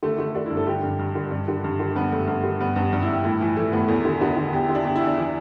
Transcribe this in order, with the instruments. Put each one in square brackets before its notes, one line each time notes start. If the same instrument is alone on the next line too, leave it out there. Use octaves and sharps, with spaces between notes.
[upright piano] D3 A3
D3 A3
D3 D4
G2 E4
A4
D3 G4
G2
G2
D3
G2 D4
D3
G2
D3
G2 B3
G2 A3
G2 B3
D3
G2 B3
G2 B3
G2 D4
E4
G2
G4
A2 E4
E3
E3 A3
A2 B3
E2 A3
D3
D3 B3
D3
E2 G4
E4
D3
D4
E2 G4
E4
E2
D4
E3